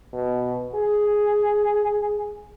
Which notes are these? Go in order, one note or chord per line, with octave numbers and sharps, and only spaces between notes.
B2
G#4